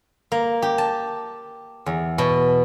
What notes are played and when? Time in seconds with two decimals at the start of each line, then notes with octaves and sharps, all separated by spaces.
0.32 A#3
0.62 G4
0.78 A5
1.86 E2
2.18 B2